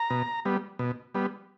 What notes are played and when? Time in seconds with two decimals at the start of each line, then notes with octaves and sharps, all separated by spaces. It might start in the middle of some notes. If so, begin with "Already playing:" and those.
Already playing: A#5
0.10 B2
0.45 G3 B3
0.79 B2
1.15 G3 B3